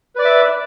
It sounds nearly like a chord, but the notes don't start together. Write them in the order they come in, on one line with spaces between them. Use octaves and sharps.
B4 D5 D6 E5